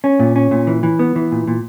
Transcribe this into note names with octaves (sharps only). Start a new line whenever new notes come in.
C#4
A#2
C#4
A#2
E3
E3
B3
E3
A#2
A#2